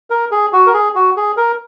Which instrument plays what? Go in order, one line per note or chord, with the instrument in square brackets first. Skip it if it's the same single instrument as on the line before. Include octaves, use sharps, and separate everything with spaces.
[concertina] A#4
G#4
F#4
A#4
G#4
F#4
G#4
A#4